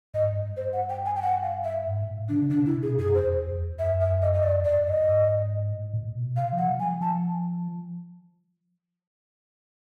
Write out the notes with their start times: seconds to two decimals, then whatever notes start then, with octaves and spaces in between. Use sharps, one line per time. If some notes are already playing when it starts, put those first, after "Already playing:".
0.14 G#2 D#5
0.36 G2
0.57 C5
0.73 F#5
0.89 G5
1.06 G#5
1.16 G5
1.22 F#5
1.43 F5
1.64 E5
1.86 G#2
2.02 A2
2.29 D3 D4
2.34 C#3
2.50 D3 D4
2.59 B2
2.66 C3 E4
2.82 B2 G#4
2.98 F#2 G#4
3.14 F2 C5
3.30 E2
3.47 F2
3.62 E2
3.79 F#2 E5
4.01 E5
4.22 D#5
4.34 D#5
4.43 F#2 D5
4.59 F2
4.65 D5
4.75 G2
4.87 D#5
4.92 G2
5.08 G#2
5.72 A2
5.94 A#2
6.15 B2
6.36 C3 F5
6.53 F3
6.58 F#5
6.68 F#3
6.79 F#3 G#5
6.85 F3
7.01 F3 A5